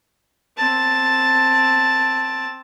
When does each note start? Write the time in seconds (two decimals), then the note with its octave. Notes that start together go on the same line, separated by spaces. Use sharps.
0.58 C4 A5